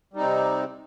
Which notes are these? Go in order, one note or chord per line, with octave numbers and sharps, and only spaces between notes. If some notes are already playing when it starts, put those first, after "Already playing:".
C3 G3 C4 D#4